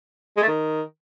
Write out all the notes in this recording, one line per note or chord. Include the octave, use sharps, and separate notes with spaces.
G#3
A3
D#3